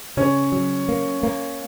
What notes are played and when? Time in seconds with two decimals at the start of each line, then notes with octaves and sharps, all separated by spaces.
0.17 C#3 C#4
0.52 F#3
0.89 A#3
1.23 A#3